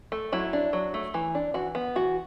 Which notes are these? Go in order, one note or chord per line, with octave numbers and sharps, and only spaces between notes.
A3
F#3 E4
D4
F#3
A3
E3
D4
E3 F#4
B3
E3 F#4